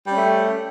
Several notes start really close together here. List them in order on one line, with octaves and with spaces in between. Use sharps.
G3 C#4 A3